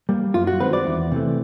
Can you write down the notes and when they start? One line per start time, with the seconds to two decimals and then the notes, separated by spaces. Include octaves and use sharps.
0.09 G3 A#3
0.34 F#2 F4
0.47 F#4
0.60 D#3 G#3 C4 B4
0.73 D5
0.86 E2
1.12 C3 E3 A3